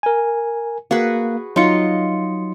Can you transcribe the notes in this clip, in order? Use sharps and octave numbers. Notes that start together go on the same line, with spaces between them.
A#4 G#5
A#3 F#4 G#4 B4
F#3 D#4 F4 C6 C#7